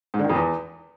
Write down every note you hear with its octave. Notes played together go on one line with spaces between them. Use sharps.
G#2
D3
D#3
F2
E2